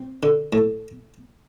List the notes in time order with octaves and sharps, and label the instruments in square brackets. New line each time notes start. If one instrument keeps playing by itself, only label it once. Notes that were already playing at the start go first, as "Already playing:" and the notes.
Already playing: [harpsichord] C4
D3
A2